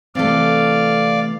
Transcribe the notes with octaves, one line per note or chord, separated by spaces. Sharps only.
C3 E3 A3 C4 A4 D5 F5